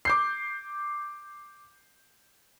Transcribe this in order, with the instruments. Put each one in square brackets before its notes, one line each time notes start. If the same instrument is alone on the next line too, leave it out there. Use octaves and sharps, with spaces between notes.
[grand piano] D6 G6 C7